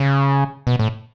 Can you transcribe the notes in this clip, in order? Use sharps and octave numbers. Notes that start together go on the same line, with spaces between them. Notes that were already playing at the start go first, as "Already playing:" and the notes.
Already playing: C#3
B2
A2